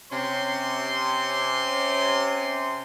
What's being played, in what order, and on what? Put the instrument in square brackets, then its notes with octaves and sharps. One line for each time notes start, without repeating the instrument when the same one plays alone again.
[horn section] C3 C#4 C6